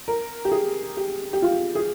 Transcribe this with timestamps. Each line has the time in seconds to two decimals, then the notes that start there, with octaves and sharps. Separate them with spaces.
0.08 A#4
0.45 G4
0.52 G#4
0.97 G4
1.33 G4
1.42 F4
1.75 G#4